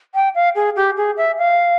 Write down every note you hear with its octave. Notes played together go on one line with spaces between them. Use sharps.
G5
F5
G#4
G4
G#4
E5
F5